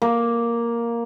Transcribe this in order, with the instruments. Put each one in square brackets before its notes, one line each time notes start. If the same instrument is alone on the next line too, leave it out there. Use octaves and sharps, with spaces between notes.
[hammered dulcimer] A#3